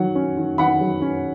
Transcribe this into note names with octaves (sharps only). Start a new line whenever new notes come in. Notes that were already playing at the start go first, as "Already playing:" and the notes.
Already playing: D#3 F#3 F#5
C#4
D#3
D#3 F#5 B5
F#3
C#4